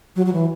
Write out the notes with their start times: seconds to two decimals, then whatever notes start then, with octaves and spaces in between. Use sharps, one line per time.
0.16 F#3
0.26 F#3
0.33 E3